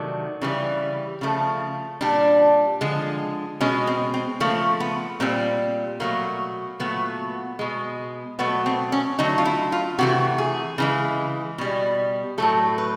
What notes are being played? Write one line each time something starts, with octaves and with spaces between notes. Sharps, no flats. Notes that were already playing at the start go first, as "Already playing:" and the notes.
Already playing: C3 D#3 F#3 A3 D4
C#3 E3 G3
C#3 F3 A3
A#2 G3 D4
D3 F3 G#3
B2 G#3 C#4
C4
C4
C#3 F3 A3 A#3
B3
A#2 G3 C4
B2 F#3 A3 A#3
A#2 F#3 A3 B3
B2 G#3
B2 F#3 A3 B3
C4
C#4
D3 F#3 A3 D#4
F4
E4
F4
C3 E3 A3 F#4
G#4
C#3 E3 G#3
B2 G3
A2 F#3 A3 A4
B4